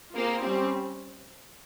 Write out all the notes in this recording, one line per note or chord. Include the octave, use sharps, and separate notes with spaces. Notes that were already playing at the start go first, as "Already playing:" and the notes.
A#3 C4 F4 G#4 C5
G3 C4 C#4 G4